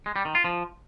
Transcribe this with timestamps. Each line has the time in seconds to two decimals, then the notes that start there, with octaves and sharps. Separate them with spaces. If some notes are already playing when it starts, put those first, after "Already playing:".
0.06 G#3
0.16 G3
0.25 D#3
0.35 F4
0.44 F3